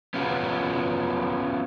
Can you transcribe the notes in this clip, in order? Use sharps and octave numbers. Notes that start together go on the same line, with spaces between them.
B3 C#4 F4 F#4